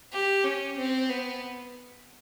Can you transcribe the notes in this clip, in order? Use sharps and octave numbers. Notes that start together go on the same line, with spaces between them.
G4
C#4
C4
B3